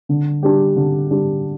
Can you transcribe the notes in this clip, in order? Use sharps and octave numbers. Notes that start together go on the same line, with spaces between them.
D3
G3 D4 G4
D3
G3 D4 G4